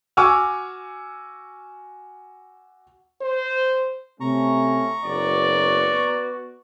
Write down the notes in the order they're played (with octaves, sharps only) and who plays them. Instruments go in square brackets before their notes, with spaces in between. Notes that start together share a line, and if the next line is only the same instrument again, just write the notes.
[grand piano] F#4 G#5 C#6 D6 E6 F6
[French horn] C5
[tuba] C3 [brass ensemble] A3 C#4 [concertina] A#5 C#6
[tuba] F#1 [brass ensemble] B3 F#4 [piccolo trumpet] D5